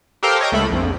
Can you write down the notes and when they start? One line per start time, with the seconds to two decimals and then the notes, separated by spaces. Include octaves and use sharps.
0.23 G4 A4 A#4 C5 F5 G5
0.41 C#5 D#5 G5
0.52 C#2 A3 B5
0.70 A#1 F2